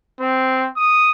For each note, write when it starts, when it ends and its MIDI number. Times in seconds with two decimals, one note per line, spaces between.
0.20 0.67 60
0.77 1.10 87